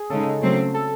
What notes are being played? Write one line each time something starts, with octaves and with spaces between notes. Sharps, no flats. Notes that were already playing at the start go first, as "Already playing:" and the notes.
Already playing: G#4
C#3 G#3 D#4 A4
C#3 F#3 A3 C4
A4